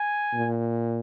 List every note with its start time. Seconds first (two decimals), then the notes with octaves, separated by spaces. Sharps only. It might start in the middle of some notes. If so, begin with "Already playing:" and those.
Already playing: G#5
0.33 A#2